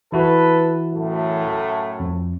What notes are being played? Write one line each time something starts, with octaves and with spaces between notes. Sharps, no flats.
E3 E4 F#4 A4 B4
F#2 A2 A3
F2